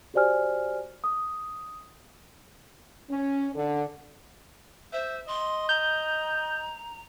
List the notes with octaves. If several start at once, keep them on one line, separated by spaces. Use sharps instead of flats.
F#4 G4 C5 D5 G#5 F6
D#6
C#4
D3
C5 E5
D#5 C6
A#5 G6